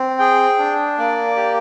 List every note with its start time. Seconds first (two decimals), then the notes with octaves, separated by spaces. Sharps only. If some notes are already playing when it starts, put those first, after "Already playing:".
Already playing: C4
0.19 G#4 G5
0.59 D4
0.98 A#3 D5
1.36 G4